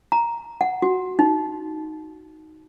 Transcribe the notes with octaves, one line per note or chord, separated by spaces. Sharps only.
A#5
F#5
F#4
D#4